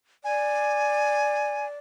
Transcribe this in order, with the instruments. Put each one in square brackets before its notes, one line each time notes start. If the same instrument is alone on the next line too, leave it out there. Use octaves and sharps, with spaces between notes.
[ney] D5 [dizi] G#5